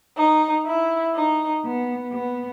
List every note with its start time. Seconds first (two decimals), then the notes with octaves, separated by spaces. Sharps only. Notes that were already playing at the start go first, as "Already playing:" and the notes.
0.17 D#4
0.66 E4
1.15 D#4
1.64 B3
2.13 B3